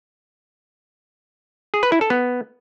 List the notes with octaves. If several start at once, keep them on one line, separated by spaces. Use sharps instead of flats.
G#4
B4
E4
A4
B3